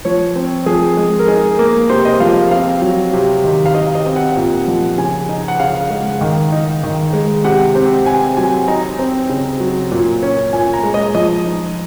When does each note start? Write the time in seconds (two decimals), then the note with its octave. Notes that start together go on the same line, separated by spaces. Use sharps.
0.05 F3 C#5
0.36 C4
0.66 F3 G#4
0.97 G#3
1.19 A#4
1.28 D#4 G#4
1.59 A#3
1.90 C3 C5
2.05 D#5
2.20 F3 F5
2.51 C4 F5
2.82 F#3
3.13 C3
3.44 D#3
3.66 F5
3.75 D#4 D#5
3.95 D#5
4.06 C4
4.16 F#5
4.36 A#2
4.67 F3
4.98 C#3 G#5
5.29 D#4
5.48 F#5
5.60 C#3 F5
5.90 G#3
6.21 D#3
6.52 D#4
6.83 D#3
7.13 G#3
7.45 C3 F#5
7.75 C4
8.06 C3 G#5
8.37 F#3 G#5
8.68 D#4 A#5
8.99 C4
9.30 C#3
9.60 F#3
9.92 A#2
10.23 C#4
10.53 A#2 G#5
10.74 A#5
10.83 G#3
10.94 D#5
11.15 F3 D#5
11.45 D#4